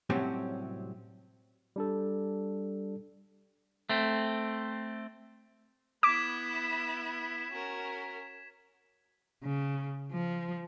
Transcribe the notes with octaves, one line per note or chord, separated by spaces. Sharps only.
A2 C3 F#3 G3 C4 C#4
G3 D4 A4
A3 C4
B3 E4 D6 G#6 B6 E7
C#4 F#4 A#4
C#3
F3